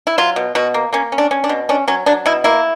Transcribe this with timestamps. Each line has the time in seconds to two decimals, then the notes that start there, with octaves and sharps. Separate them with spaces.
0.07 E4
0.18 F#3 F4
0.36 B2
0.55 B2 F#4
0.74 A#3
0.93 A#3 C#4
1.12 C#4
1.18 D4
1.31 C#4
1.44 D4
1.49 B2
1.69 C#4 D4
1.88 F#3 C#4
2.06 F#3 D4
2.26 B2 E4
2.44 A#3 E4